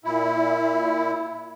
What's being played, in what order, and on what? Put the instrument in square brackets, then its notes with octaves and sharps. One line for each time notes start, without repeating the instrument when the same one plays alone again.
[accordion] A#2 E4